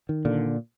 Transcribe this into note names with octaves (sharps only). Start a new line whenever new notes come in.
D#3
A#2 D3